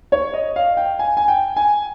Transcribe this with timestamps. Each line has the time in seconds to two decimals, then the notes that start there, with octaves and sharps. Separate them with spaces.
0.12 C#5
0.34 D#5
0.56 F5
0.77 G5
0.99 G#5
1.17 G#5
1.28 G5
1.56 G#5